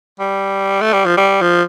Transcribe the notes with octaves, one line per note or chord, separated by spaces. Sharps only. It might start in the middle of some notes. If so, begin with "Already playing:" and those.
G3
A3
G3
F3
G3
F3